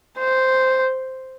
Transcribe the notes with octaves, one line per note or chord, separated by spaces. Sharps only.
C5